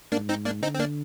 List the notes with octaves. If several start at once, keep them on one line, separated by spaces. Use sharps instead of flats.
G#2 A#3 D4
C4 D#4
A#3 D4
D3 C4 D#4
C4
A#3 D4